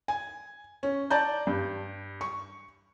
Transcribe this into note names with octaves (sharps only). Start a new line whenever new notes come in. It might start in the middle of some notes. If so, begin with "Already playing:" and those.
G#5
C#4
D5 A5 A#5 G6
G2
C#6